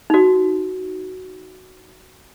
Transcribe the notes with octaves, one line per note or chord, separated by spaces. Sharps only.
D#4 F#4